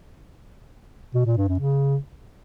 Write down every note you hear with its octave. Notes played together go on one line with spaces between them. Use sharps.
B2
A#2
G2
F#2
C#3